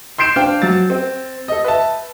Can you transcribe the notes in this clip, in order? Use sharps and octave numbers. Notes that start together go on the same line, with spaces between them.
C6 G6 C7 D7 E7
D4 C5 F5 G5
F#3 A6
C4
A4 D#5
B4 E5 A5